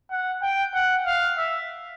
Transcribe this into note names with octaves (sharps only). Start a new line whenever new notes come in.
F#5
G5
F#5
F5
E5